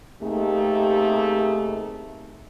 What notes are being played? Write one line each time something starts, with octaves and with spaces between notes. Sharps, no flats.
C3 A3 A#3 D#4 G4 G#4